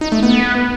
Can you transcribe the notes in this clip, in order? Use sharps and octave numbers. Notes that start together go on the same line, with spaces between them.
D#4
A3
B3